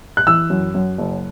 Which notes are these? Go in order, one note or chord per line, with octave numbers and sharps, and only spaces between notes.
F#6
E3 E6
F#2
F#2
F#1